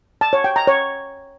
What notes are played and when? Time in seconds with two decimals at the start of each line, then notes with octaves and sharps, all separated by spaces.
0.21 A5
0.33 C#5
0.44 G5
0.56 A#5
0.67 C#5